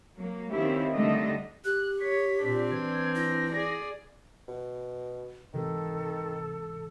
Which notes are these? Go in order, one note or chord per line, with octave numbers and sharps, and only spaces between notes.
F#3 A#3
D#3 A#3 C4 C#4 E4 G4
D3 D#3 G3 A3 D4 D#5
G4 F#6
C#5 B6
A#2 C4 D4
E3 G#6
E4 A#6
G#4 D5
B2
G#2 C3 D#3 E3 A4